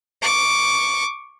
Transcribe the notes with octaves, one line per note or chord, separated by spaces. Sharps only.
C#6 D6